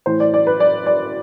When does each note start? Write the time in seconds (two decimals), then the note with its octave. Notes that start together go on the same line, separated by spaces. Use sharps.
0.06 A2 E3 C5
0.20 D5
0.34 D5
0.47 B4
0.60 D5
0.86 D5